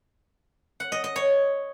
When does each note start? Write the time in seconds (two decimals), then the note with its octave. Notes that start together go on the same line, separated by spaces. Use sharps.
0.80 F#5
0.92 D#5
1.04 D#5
1.16 C#5